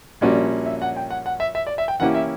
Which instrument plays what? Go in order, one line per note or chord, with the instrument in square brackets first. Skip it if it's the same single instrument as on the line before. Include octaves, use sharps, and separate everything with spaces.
[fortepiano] A#1 A#2 G3 C#4 F#4 [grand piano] D5
[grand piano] E5
F#5
G5
F#5
F#5
E5
E5
D5
E5
G5
[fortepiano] E3 A#3 C#4 E4 G4 [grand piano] F#5
[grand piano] E5